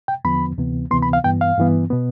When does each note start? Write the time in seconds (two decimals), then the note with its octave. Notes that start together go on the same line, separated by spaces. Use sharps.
0.08 G5
0.25 E2 D3 F3 B3 B5
0.58 D2 C3 E3 B3
0.91 D2 C3 E3 B3 C6
1.03 B5
1.13 F5
1.24 G2 E3 B3 G5
1.41 F5
1.58 G2 E3 B3
1.90 B2 B3